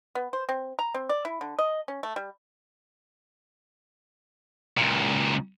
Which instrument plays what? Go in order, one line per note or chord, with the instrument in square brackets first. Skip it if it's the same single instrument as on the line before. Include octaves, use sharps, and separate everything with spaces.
[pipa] B3
C5
C4
A#5
C4
D5
E4
D3
D#5
C#4
A3
G3
[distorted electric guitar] C#2 A#2